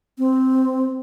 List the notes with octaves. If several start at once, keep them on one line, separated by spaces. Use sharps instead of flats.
C4